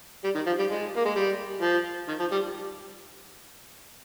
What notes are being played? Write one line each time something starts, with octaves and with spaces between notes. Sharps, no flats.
G3
D#3
F3
G3
G#3
A#3
G#3
G3
F3
D#3
F3
G3